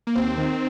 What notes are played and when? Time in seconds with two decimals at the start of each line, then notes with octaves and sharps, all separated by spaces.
0.07 A#3
0.15 D#2 C4
0.38 D#3